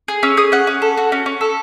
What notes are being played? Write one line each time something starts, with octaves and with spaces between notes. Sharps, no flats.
G#4
C#4 E6
G#4 D#6
C#4 F#5
C#4
A4
F#4
C#4
C#4
A4